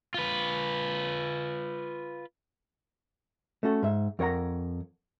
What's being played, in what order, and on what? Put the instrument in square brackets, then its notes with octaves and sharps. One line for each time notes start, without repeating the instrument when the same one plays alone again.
[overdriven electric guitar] F4 B4
[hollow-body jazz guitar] A3 C#4 F#4 A4
G#2 E5
F2 A#4 C#5 F#5 A#5